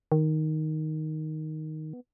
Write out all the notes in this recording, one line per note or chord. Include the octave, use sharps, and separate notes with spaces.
D#3
B3